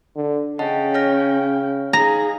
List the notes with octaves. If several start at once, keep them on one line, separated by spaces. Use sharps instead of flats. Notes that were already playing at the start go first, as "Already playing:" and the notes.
D3
C#3 C#4 D#5 F#5 G5 A5
C#5 F6 A#6
D#4 G#4 F5 A#5